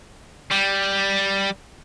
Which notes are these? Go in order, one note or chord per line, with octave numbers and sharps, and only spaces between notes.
G3